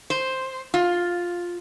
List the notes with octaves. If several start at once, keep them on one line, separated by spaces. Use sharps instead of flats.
C5
F4